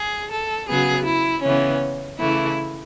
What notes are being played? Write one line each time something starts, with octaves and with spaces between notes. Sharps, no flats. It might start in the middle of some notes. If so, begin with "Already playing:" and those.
Already playing: G#4
A4
C#3 F#3 B3 G#4
E4
C#3 E3 B3 C#4
C#3 E3 A3 E4